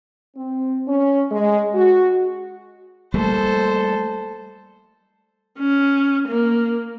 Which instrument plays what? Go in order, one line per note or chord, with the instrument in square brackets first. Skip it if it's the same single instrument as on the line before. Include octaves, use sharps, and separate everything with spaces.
[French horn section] C4
C#4
G#3
F#4
[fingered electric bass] G3 A3 A#3 [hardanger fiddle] A4 C5
[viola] C#4
A#3